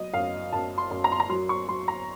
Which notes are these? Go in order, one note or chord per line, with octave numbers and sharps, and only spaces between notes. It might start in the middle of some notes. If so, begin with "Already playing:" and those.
Already playing: F#3 D#5
F#2 F5
F#2 A5
C6
F#2
A#5
C6
A#5
F#3 C6
C#6
F#3 C6
A#5